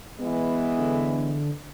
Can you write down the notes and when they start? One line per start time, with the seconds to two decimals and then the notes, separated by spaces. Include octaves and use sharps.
0.21 E3 G#3 B3
0.78 D3